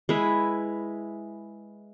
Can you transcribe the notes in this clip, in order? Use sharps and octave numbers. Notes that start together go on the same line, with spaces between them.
G#3 E4 B4